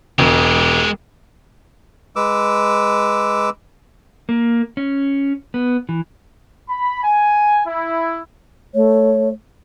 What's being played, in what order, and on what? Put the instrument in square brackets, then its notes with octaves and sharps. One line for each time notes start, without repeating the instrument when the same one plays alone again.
[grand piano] E1 [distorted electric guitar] G#3 G4
[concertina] G#3 B4 D6 E6
[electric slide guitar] A#3
C#4
B3
E3
[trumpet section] B5
G#5
E4
[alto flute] A3 [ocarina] C#5